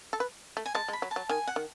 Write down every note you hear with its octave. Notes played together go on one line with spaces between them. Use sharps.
A4
B4
A3
G#5
G#3 A5
G#3
B5
F#3
A5
F#3
D#3 G#5
F#5
D#3